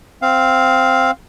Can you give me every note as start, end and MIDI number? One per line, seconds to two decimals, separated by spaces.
0.22 1.11 60
0.22 1.11 77